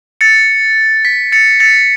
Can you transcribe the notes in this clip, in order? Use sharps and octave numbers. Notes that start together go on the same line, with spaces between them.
A6 C#7
B6
A6 C#7
A6 C#7